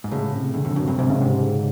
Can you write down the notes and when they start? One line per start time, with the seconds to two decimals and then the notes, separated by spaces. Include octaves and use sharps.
0.04 G#2
0.11 A2 C#3
0.34 C3
0.54 E2 D3
0.65 F2
0.76 F#2 C3
0.87 G2
0.99 G#2 C3
1.10 C#3
1.21 C3
1.42 C#3